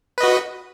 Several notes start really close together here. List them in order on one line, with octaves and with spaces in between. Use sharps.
B4 D#5 F#4